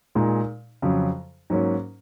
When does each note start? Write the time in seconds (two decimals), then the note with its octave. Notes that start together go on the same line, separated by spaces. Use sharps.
0.15 A#2 G#3 D#4
0.82 F2 C#3 F#3
1.50 G#2 F#3 A#3 C#4